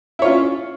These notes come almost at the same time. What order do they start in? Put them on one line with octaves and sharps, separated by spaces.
E4 C#5 F4 C#4